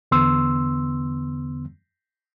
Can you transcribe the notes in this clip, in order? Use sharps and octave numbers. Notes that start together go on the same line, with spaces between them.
E2 D3 B3 C6 E6